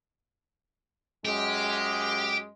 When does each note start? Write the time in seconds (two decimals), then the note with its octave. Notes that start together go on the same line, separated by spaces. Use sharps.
1.26 F#2 G#3 G4